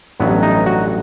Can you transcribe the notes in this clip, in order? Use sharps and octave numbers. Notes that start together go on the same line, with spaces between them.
A1 G2 F#3 B3
D#4
F#4